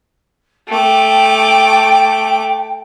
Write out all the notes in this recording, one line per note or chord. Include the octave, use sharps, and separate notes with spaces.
A3 G5 D6